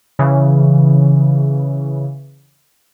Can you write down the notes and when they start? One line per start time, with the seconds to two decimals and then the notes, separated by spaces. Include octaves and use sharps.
0.19 C#3 E3